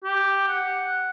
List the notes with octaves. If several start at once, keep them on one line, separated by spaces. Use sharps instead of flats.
G4
F#5